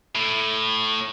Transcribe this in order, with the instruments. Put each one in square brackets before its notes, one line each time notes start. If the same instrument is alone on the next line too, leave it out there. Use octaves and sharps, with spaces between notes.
[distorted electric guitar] A2